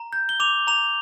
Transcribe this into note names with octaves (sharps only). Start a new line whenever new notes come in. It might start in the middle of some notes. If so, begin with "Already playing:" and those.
Already playing: A#5
G6
G7
D6 F7
A#5 F7